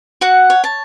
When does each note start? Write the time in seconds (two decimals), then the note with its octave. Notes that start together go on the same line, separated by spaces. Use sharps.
0.21 F#4 F#5
0.50 C#5
0.64 A5